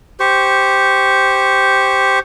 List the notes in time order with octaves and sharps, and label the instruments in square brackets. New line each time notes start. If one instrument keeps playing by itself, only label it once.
[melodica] G4 C5 C#6